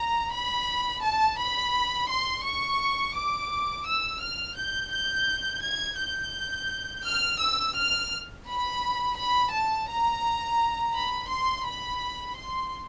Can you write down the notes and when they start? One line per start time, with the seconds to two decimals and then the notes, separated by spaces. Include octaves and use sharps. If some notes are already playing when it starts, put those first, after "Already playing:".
Already playing: A#5
0.33 B5
1.03 A5
1.38 B5
2.10 C6
2.45 C#6
3.15 D6
3.87 E6
4.22 F6
4.56 G6
4.92 G6
5.63 G#6
5.99 G6
7.05 F6
7.41 E6
7.76 F6
8.47 B5
9.18 B5
9.52 A5
9.88 A#5
10.94 B5
11.29 C6
11.65 B5
12.36 C6